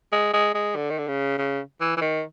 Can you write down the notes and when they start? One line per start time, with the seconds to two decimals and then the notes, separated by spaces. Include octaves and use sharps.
0.12 G#3
0.33 G#3
0.54 G#3
0.76 D3
0.90 D#3
0.98 D3
1.07 C#3
1.38 C#3
1.80 E3
1.97 E3
2.01 D#3